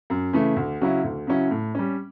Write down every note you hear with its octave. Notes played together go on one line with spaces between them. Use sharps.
F#2
C#3 E3 A3
D2
C#3 F#3 C#4 E4
D2
C#3 F#3 C#4 E4
A2
G3 C#4